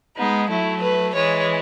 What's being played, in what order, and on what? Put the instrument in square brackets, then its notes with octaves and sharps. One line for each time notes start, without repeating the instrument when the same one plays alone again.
[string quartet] G#3 B3 [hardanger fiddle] D#4
[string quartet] F#3 A3 [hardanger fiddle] E4
[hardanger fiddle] B4
[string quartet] E3 G#3 [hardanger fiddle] C#5